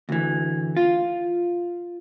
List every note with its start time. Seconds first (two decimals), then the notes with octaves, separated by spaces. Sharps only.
0.09 D2 E3
0.77 F4